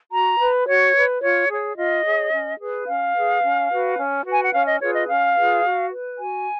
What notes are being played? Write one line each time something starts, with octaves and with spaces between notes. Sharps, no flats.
F#4 A#5
B4
F#4 C#5
B4
F4 C#5
G#4
C#5
F4 D#5
G#4 C#5
C#4
G#4 B4
C#4 F5
G#4 B4
C#4
F#4 B4
C#4
F#4 B4
G#5
F#5
C#4 F5
D#5
F4 G#4 B4 C#5
D#5
C#4 F5
F4 G#4 B4
F#4
B4
F#4 G#5